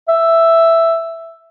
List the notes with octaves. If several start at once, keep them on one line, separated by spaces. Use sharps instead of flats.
E5